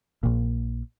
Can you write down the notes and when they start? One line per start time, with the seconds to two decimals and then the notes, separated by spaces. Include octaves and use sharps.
0.23 A#1 A#2